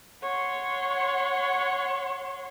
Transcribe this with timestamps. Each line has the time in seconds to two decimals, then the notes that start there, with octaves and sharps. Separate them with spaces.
0.22 C#5 F#5 C6